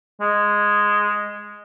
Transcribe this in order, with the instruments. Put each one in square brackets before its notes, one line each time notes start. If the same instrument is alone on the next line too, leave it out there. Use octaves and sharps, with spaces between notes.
[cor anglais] G#3